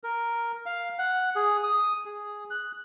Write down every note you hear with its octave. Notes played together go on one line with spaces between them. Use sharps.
A#4
F5
F#5
G#4
D#6
G#4
F#6